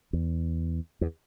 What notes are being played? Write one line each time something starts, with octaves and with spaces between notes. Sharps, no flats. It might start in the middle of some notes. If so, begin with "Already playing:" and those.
E2
E2